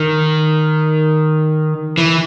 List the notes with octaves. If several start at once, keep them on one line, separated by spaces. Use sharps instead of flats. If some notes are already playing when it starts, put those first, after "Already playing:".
Already playing: D#3
E3